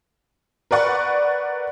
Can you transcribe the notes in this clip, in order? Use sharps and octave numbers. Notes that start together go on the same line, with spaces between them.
A#4 B4 D5 F#5 C#6